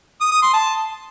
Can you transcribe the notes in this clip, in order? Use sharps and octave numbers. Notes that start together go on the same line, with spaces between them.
D#6
D#6
C6
A5